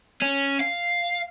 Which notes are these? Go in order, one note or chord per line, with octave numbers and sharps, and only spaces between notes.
C#4
F5